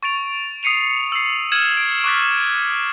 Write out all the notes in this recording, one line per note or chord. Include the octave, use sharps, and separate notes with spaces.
C#6 A6 D7 F7
D#6 C7 C#7 D#7 F7
E6 C7
F6 G#6 D#7 E7 F#7
D7
C#6 D6 F6 F#6 A6 B6